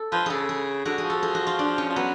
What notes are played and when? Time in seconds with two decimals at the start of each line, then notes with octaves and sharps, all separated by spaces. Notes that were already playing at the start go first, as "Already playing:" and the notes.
Already playing: A4
0.12 F3 B4
0.26 C#3 G#4 A4
0.49 G#4
0.85 D3 F#4
0.98 G#4
1.04 F3
1.10 A4
1.23 G#4
1.35 F#4
1.47 F4
1.59 D4
1.78 C#4
1.90 F3
1.96 F#3 B3